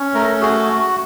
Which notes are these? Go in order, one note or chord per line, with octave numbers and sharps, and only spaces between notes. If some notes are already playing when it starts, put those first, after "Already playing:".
Already playing: C#4
A3 A#4
F#4 G#4